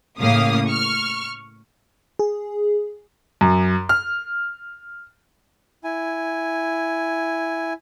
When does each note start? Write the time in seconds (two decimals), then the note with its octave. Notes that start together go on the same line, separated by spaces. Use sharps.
0.20 A2 C#3 A#3 F5 D#6
0.67 C#6 F6
2.19 G#4
3.41 F#2
3.89 F6
5.84 E4 G#5